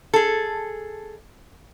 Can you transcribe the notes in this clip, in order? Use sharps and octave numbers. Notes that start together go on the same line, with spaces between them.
G#4 A4